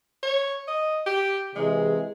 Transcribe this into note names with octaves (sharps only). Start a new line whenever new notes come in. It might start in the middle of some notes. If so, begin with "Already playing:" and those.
C#5
D#5
G4
C3 E3 G#3 G#4